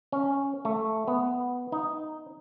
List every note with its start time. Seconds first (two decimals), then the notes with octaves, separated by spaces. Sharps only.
0.12 C#4
0.65 A3
1.08 B3
1.72 D#4